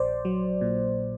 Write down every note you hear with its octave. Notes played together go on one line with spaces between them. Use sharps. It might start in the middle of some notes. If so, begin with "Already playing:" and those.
Already playing: A#1 C5 D5
F#3
A#2